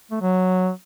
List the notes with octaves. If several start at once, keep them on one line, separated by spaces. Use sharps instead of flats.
A3
F#3